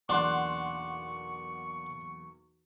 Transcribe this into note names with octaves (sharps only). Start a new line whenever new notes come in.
B1 E2 A#3 D4 F#5 C6 C#6 F#6